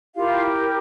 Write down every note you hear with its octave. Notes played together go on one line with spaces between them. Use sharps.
E4 F4 G4 A#4 F5